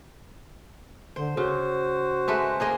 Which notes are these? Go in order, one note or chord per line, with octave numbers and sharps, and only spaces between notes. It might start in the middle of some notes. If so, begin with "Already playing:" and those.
D3 C5
C#3 F#4 C5
G#3 A3 B4
A#3 G#4 D#5